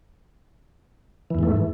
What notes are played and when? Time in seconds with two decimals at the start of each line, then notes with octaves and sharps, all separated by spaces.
1.30 E3
1.35 E2
1.39 G#2
1.43 A3